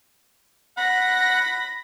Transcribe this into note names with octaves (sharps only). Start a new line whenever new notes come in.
F#5 B5 A#6